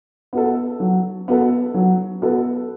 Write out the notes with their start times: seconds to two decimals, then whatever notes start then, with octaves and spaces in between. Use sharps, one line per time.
0.33 B3 F#4 A4
0.80 F#3
1.28 B3 F#4 A4
1.74 F#3
2.22 B3 F#4 A4